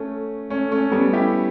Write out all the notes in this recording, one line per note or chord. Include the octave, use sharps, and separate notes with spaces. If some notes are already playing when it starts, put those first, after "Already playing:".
Already playing: A3 C#4
A3 C#4
A3 C#4
G3 B3
E4 G4